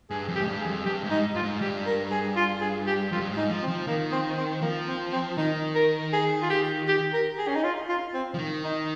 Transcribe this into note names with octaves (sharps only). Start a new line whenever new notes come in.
G2 G#4
F2
G4
G#2
G2
G#4
F2
G2 G4
G#2
D#4
G2 F4
G#2
G2 G4
A#4
G#4
F4
G#4
G4
F2 F4
G2
G#2
D#4
F3
C4
F3
D#3 A#3
C4
C4
F3 A#3
C4
C4
D#3 D#4
A#4
G#4
F4
G4
G4
A#4
G#4
C#4
D#4
F4
F4
C4
F3
D#3
D#4